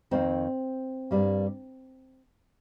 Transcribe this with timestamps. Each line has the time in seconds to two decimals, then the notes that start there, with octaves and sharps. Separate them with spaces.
0.11 F2 D#3 G3 A#3 C4
1.11 G2 G3 A#3